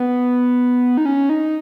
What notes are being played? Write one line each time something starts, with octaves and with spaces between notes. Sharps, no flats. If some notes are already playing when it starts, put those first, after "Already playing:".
Already playing: B3
D#4
C#4
D#4